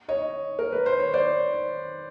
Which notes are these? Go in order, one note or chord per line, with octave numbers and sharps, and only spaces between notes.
C#5 D#5
A#4
B4
C5
C#5
C5 D5